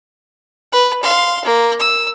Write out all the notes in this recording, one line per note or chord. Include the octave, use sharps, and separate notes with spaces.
B4
F5 C6
A#3
E6